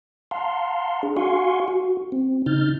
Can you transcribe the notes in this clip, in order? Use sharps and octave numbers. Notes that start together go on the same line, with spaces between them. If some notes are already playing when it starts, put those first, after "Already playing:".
F5 F#5 A5 A#5 C6
D4 G#4
F#4 F5 F#5 G#5 C6 C#6
F#4
C4
C#3 D#4 F6 G6 A6